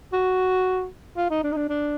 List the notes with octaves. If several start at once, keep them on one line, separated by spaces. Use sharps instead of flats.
F#4
F4
D#4
D4
D#4
D4
D4